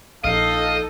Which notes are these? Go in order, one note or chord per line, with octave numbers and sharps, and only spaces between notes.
A#1 D#4 A4 D#5 F5